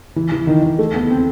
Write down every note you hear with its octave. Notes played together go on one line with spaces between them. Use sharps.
E3
E3
D#3
D#3
A3
B3
C4